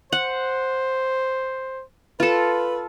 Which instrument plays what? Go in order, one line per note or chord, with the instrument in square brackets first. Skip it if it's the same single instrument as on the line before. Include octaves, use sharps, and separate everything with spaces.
[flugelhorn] C5 [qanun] F#5
[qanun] F4 A4 [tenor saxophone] B4